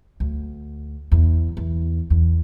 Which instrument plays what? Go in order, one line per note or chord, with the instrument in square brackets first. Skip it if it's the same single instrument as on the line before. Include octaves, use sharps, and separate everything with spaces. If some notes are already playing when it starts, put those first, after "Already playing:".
[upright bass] D2
E2
E2
E2